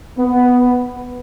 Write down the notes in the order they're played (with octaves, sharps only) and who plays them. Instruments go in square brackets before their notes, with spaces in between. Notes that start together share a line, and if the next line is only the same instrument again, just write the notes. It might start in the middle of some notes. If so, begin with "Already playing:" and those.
[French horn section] B3